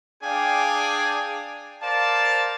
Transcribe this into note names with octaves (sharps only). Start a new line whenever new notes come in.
D4 G#4 D5 F5 G5 G#5
A#4 C5 D5 F5 A5